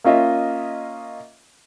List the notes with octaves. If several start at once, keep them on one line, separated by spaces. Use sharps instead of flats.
A#3 C#4 F4 D#5 E5